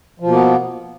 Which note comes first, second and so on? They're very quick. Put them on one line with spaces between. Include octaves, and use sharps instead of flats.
F3 B2 A#3 B3